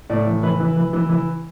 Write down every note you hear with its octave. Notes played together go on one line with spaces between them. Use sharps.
A2 D5
E3
E3 B4
E3
E3
E3
E3